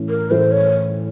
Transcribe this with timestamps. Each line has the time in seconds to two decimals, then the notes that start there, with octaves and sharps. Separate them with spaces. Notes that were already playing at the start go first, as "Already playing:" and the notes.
Already playing: A2 E3 A3 C#4 E4
0.09 A#4
0.31 A2 E3 A3 C#4 E4 C5
0.52 C#5